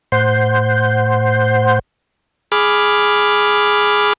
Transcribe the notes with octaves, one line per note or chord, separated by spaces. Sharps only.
A2 C5 F#5 C6 G6
G#4 B5 D6 F6